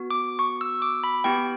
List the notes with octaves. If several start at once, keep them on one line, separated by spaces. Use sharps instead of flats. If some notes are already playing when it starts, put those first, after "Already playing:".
Already playing: B3 F#4
D6
C#6
E6
D6
B5
B3 E4 G4 G5